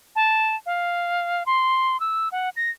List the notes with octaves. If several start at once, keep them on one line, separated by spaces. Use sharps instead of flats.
A5
F5
C6
E6
F#5
A#6